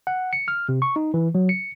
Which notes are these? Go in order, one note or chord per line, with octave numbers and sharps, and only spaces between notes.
F#5
C#7
F6
C3
C#6
D#4
E3
F#3
C#7